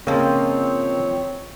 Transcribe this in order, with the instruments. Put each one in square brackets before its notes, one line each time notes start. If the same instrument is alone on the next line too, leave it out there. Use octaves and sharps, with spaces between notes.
[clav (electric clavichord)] C#3 A#3 [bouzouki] F3 D#5 [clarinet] C4 [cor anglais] C#5